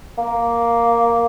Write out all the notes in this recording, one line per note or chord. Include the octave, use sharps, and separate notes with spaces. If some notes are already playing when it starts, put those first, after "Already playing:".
A#3